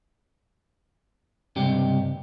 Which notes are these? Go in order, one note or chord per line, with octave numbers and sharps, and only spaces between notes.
C#2 G2 C3 G4